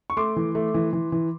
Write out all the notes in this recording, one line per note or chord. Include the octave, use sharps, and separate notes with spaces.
C#6
A3 C6 D6
E3
A3
E3
E3
E3